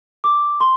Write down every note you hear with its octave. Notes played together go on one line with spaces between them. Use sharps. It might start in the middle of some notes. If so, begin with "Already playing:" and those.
D6
C6